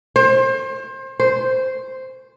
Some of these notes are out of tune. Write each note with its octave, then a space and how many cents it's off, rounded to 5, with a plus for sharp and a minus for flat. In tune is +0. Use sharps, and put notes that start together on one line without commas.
C5 +30
C5 -5